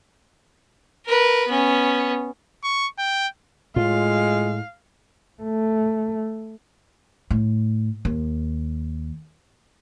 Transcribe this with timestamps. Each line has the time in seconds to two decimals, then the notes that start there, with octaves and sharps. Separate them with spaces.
1.06 A#4 B4
1.47 B3 C#4
2.64 C#6
2.99 G5
3.76 A2 G#3 F4 F5
5.43 A3
7.31 A2
8.05 D#2